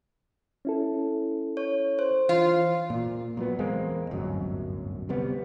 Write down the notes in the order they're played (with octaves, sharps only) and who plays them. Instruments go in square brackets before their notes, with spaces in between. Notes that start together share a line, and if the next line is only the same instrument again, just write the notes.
[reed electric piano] C#4 E4 A4
[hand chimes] C#5
C5
[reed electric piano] E3 [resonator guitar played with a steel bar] F4
[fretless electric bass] A#2
A#2 F#3 B3
E2 G#3 A#3 C4
D1 G1 F#2 F#3
C3 G3 B3